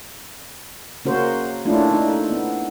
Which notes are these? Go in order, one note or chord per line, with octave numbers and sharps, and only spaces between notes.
C#3 A#3 C#4 F#4 A#4 C5
A3 A#3 C#4 D4 E4 F4
D#4
A4
B3